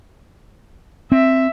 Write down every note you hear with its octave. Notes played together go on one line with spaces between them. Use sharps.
C4 E5